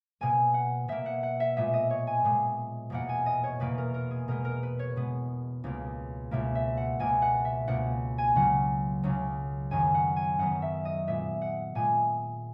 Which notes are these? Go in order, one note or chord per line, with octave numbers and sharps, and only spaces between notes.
B2 A#3 G#5
F#5
B2 A#3 E5
F#5
F#5
E5
A#2 G#3 B3 E5
D#5
C#5
G#5
A#2 G#3 B3
E2 B2 A#3 F#5
G#5
D#5
C#5
E2 B2 A#3 B4
A#4
A#4
G#4
B2 G#3 B3 A#4
A#4
B4
C#5
B2 G#3 B3
C#2 B2 A#3
C#2 B2 A#3 E5
E5
F#5
C#2 B2 A#3 G#5
F#5
E5
C#2 B2 A#3 F#5
G#5
C#2 C#3 F#3 F#5
C#2 C#3 F#3
F#2 D#3 F#3 B3 G#5
F#5
G#5
F#2 D#3 F#3 B3 F#5
E5
D#5
A#2 G#3 B3 E5
F#5
A#2 G#3 B3 G#5